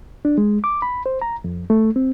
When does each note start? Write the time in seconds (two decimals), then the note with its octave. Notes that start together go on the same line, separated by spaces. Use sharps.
0.25 D4
0.38 G#3
0.64 D6
0.82 B5
1.06 C5
1.22 A#5
1.44 F2
1.70 A3
1.96 C4